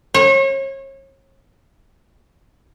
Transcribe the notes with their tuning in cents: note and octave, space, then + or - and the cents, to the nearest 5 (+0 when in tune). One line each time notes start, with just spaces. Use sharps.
C#5 -35